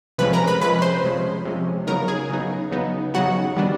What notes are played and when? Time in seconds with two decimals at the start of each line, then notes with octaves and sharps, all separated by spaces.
0.18 C3 F3 G#3 C#4 B4 B5
0.33 A#4 A#5
0.47 B4 B5
0.61 C3 F3 G#3 C#4 B4 B5
0.82 C5 C6
1.04 C3 F3 G#3 C#4
1.45 C3 F3 G#3 C#4
1.87 C#3 F#3 B3 D#4 A#4 A#5
2.08 G#4 G#5
2.30 C#3 F#3 B3 D#4
2.71 C#3 F#3 B3 D#4
3.14 C#3 F#3 B3 D#4 F#4 F#5
3.56 D#3 G3 B3 D4